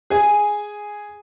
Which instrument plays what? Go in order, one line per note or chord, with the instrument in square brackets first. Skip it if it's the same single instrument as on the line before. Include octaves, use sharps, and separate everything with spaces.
[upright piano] G#4 G#5